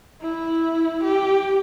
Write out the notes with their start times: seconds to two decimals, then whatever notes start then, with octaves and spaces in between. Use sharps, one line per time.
0.22 E4
1.03 G4